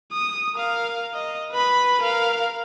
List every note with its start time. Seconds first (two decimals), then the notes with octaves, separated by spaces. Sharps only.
0.12 D#6
0.56 A#4 F5
1.14 D#5
1.52 B4 B5
2.01 A#4 F5